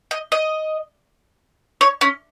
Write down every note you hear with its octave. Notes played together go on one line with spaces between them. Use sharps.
D#5
D#5
C#5
C#4